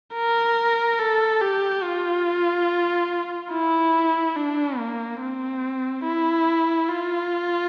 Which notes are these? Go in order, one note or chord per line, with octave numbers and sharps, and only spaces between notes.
A#4
A4
G4
F4
E4
D4
A#3
C4
E4
F4